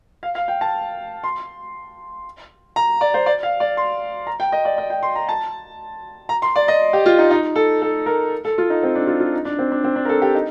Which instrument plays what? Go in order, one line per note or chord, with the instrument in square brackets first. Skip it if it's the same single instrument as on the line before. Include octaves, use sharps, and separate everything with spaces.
[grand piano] F5
F5
G5
A5
C6
A#5
D5
C5
D5
F5
D5
C6
A#5
G5
D#5
D5
D#5
G5
C6
A#5
A5
A#5
C6
D5
D#5
G4
F4
D#4
D#4
A4
A4
A#4
A4
F4
D#4
C4
D4
F4
F4
D#4
D4
C4
D4
C4
D4
A#4
A4
G4
D#4